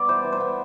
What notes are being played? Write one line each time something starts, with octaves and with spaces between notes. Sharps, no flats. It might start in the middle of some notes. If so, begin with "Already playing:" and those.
Already playing: G3 B3 D5
E3 C5
E3
C5
B3